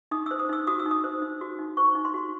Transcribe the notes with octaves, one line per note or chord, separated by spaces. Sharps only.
D#4 D#6
C5 E6
D#6
D#4 E6
F#4 D#6
E6
D#4
D#6
C5
D#4
F#4
D#4
C5 C#6
D#4
C6
F#4